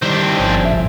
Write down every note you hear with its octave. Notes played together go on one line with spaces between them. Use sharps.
D#3 G3 C4 D4 E4
G1 C#3 F3 G#5
C2 A2 E5